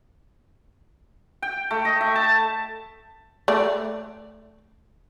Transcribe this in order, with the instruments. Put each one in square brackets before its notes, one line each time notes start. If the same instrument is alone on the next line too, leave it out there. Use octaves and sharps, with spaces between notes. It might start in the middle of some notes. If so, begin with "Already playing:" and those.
[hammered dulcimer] G5
A3
D#5
E5
A5
[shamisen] A3 D5